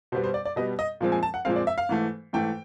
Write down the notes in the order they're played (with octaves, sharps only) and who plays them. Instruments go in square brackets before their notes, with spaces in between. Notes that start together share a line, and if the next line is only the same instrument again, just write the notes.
[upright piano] B2 G3 B3 C5
C5
D5
D5
B2 G3 B3 D#5
D#5
A#2 F3 G#3 C4
G#5
A5
F#5
A#2 F3 G#3 C4 F5
D5
E5
F5
G#2 E3 A3
G#2 E3 A3 G5